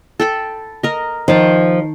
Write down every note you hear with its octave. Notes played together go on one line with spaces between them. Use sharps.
A4 G5 B5
A#4 D#5
D#3 F3 A5